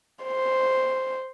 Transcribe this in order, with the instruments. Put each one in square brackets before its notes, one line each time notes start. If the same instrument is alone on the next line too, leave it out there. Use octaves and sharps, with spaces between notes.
[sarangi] C5